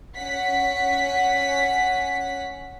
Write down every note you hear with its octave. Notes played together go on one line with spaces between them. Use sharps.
C#4 F#5 B6